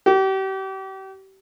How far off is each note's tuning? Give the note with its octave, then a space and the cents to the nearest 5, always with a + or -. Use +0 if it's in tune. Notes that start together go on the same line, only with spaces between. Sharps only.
G4 -35